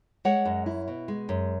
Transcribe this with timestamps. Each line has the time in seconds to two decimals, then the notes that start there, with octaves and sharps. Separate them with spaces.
0.25 G#3 C#5 F#5
0.45 F#2
0.66 E4
0.88 B2
1.08 G#3
1.29 F#2